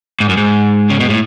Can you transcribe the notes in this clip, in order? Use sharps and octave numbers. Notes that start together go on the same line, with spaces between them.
G#2
F#2
G#2
C#3
B2
A2